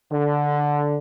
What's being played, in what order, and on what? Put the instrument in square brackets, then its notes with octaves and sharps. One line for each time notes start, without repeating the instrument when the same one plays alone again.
[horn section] D3